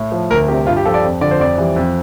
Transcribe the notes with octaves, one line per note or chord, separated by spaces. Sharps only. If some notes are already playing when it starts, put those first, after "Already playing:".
Already playing: A2
F3
D2 A#4
C3 G3 G4
G2 F4
G4
F3 A4
D5
F2
D3 F3 D5
C5
F2 D5
E3 G3
F2